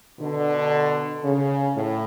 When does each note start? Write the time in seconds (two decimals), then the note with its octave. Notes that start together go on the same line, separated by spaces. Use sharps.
0.20 B2 D3
1.24 C#3
1.76 A2